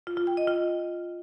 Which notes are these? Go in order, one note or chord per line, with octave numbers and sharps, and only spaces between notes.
F4
F4
G5
D#5
F4